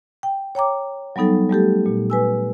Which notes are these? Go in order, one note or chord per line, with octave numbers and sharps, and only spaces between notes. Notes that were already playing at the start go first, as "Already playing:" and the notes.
G5
C#5 G5 A#5 D6
F#3 G3 B3 D#4 A4
G3 A3 G4 A4
A#2
B4 G#5 E6